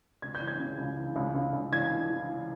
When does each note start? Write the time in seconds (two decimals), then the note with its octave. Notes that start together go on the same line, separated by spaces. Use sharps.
0.22 C#2 G#6
0.35 G6
0.41 E3
0.48 G#6
0.59 C#3
0.78 C#2
0.98 E3
1.16 C#2
1.35 C#2
1.53 C#2
1.72 E3 G#6
1.91 E3
2.10 E3
2.29 E3